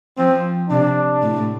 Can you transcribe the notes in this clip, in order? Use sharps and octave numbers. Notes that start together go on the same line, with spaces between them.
F3 C4
C3 D4
A2